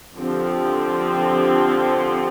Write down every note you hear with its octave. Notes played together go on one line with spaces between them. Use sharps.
D3 F3 C4 G4